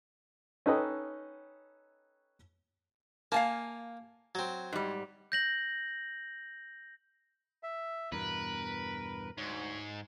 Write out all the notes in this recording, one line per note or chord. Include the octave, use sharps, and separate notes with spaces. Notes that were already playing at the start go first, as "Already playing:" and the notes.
C#4 D#4 A4 B4 D#5 G5
A#3 F5 G#5 A5
F#3 C4
G#2 G3
G6 A#6 F#7
E5
E2 G2 B2 A#4 B4
D2 G#2 C#5